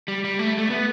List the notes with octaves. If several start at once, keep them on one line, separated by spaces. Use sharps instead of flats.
G3
G3
A3
A3
B3